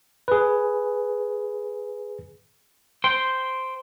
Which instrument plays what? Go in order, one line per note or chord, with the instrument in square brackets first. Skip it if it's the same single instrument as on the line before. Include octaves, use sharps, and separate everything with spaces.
[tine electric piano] G#4 B4
[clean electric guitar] C5 G5